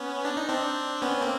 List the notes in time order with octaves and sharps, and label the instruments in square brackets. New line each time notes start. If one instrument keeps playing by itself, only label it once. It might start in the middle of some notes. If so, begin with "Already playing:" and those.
Already playing: [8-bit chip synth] B3 C#4
D4
D#4
C4 D4
B3 C#4
A#3 C4